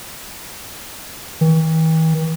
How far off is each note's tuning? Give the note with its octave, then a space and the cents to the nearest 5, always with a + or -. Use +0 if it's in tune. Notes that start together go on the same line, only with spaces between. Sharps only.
E3 -45